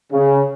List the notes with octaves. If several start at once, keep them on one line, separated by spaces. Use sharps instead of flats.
C#3